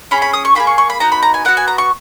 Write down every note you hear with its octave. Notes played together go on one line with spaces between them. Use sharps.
C#4 G#4 B5
B5
D#6
C#6
A#3 D#4 G#4 B5
C#6
C#6
B5
B3 D#4 F#4 A#5
B5
A#5
G#5
B3 F#4 F#5
G#5
A#5
C#6